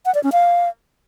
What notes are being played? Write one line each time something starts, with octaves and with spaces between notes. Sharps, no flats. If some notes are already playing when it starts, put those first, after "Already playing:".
F#5
D5
C#4
F5